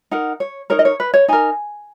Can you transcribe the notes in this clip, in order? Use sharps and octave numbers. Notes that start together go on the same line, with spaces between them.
D#4 A#4 F#5
C#5
D#4 A#4 C#5
D#5
C#5
B4
C#5
D#4 A#4 G#5